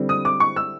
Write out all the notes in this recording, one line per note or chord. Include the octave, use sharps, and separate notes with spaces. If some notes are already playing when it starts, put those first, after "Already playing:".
Already playing: D3 G3 C4 E4
D#6
D6
C#6
E6